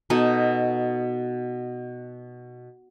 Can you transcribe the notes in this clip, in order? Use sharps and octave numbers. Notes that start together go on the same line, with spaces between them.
B2 D#4 A4 B4